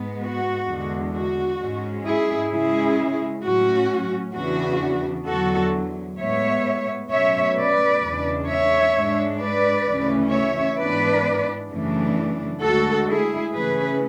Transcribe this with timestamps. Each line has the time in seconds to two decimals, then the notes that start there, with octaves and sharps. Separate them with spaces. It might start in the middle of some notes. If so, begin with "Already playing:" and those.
Already playing: G#2 G#3 B3
0.21 F#4
0.67 E2 D3 G#3
1.13 F#4
1.59 G#2 G#3 C#4
2.05 E4 G#4
2.50 C#3 G#3 C#4 E4 G#4
3.43 A2 F#3 C#4 F#4
4.34 E2 C#3 E3 B3 D4 F#4
5.27 E2 D3 F#3 F#4 A4
6.18 A2 G#3 B3 C#5 E5
7.10 B2 F#3 A3 C#4 C#5 E5
7.56 B4 D5
8.02 E2 C#3 G#3 D4
8.48 C#5 E5
8.94 G#2 G#3 D4
9.40 B4 D5
9.86 D2 C#3 E3 A3 C#4
10.32 C#5 E5
10.77 G#2 E3 B3 D4 B4 D5
11.69 F#2 C#3 E3 A3 D4
12.62 D2 D3 G#3 F#4 A4
13.07 E4 G#4
13.53 C#3 E3 A3 C#4 G#4 B4